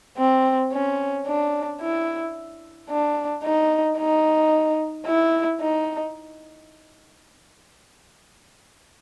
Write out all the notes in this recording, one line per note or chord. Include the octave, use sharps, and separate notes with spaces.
C4
C#4
D4
E4
D4
D#4
D#4
E4
D#4